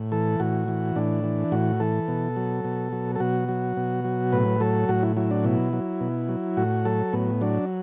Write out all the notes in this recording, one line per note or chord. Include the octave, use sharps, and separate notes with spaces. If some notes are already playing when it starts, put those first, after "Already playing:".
Already playing: A2
E3 A4
A2 F#4
E3
A2 D4
E3
A2 F#4
E3 A4
B2
F#3
B2
F#3
A4
B2 F#4
F#3
B2
F#3
A2 B4
F#3 A4
A2 F#4
E4
F#3 E4
D4
B2 E4
F#3
B2
F#3
A2 F#4
F#3 A4
A2 B3
F#3 D4